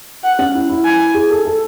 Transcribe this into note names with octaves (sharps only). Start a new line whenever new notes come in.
F#5
C#4
E4
E4
G#5
G#4
A4
A4